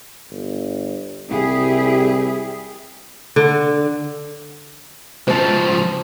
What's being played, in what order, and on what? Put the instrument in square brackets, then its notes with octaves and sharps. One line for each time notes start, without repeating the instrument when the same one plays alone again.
[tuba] G1
[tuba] C2 [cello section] E4 G4 G#4
[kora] D3
[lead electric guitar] C#2 F3 [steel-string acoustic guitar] C5 A5